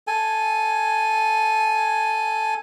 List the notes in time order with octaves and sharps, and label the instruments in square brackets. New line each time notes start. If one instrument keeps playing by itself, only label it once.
[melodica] A4 G#5